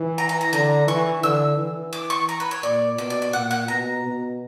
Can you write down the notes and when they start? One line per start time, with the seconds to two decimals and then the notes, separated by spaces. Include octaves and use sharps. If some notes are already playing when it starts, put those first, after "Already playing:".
Already playing: E3
0.18 A#5
0.29 A#5
0.41 A#5
0.53 D3 A#5
0.87 E3 C#6
1.23 D3 E6
1.58 E3
1.93 D6
2.10 C#6
2.29 A#5
2.40 B4
2.51 C#5
2.63 A#2 D5
2.98 B2 D5
3.10 D5
3.22 D5
3.33 A#2 F#5
3.51 F#5
3.68 B2 A#5
4.04 B2